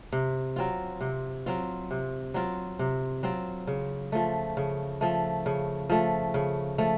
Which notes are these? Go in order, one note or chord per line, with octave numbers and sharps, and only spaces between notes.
C3
F#3 C4 F4
C3
F#3 C4 F4
C3
F#3 C4 F4
C3
F#3 C4 F4
C#3
F3 A3
C#3
F3 A3
C#3
F3 A3
C#3
F3 A3